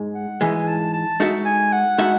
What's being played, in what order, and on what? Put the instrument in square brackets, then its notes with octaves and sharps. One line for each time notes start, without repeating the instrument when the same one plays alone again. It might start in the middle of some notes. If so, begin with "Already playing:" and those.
Already playing: [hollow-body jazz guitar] G#2 G#3
[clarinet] F#5
[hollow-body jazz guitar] G#2 E3 G#3 [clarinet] G#5
[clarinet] A5
A5
[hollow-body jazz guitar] G#3 D#4 F#4 A4 E5
[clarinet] G#5
F#5
[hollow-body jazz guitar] G#3 D#4 F#4 A4 E5